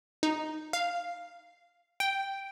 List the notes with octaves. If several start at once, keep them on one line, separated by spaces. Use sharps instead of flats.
D#4
F5
G5